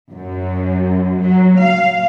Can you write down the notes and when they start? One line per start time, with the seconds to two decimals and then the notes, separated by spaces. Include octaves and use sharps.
0.11 F#2
1.20 F#3
1.60 F5